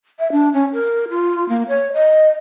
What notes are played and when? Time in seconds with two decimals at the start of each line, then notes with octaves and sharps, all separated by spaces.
0.19 E5
0.32 D4
0.54 C#4
0.73 A#4
1.10 F4
1.49 A#3
1.68 C#5
1.94 D#5